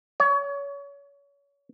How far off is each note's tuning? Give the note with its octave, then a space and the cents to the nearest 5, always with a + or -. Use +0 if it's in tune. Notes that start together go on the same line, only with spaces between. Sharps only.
C#5 +30